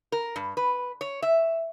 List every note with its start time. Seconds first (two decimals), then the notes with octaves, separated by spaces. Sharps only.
0.12 A#4
0.36 G2
0.57 B4
1.01 C#5
1.22 E5